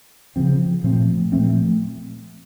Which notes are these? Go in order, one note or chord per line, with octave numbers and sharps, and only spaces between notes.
C#3 F3 C4
A#2 F3 A3 C4
A#2 F3 A3 C4